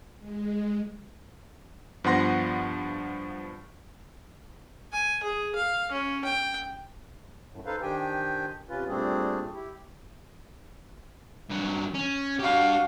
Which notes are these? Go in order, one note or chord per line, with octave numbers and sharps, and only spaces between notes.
G#3
G2 F3 B3 F#5 C6 A#6
G#5
G#4
F5
C#4
G5
F#2 A2
D#4 A4 B4 C5 F5
D#3 D4 G4 C5 G5 G#5
C3 C#4 F4 B4
A#2 G3 A3 C4 D4 G#4
E4 G4
G2 F#3
C#4
D4 F#4 G4 F5